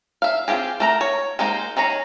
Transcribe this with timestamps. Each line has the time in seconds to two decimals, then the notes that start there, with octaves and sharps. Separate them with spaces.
0.22 E5 F5
0.48 C4 F4 G4 G#4
0.80 A3 A#4 A#5
1.01 C#5
1.39 G#3 A#3 D#4 A4 C5
1.77 D#3 G#4 C#5 A#5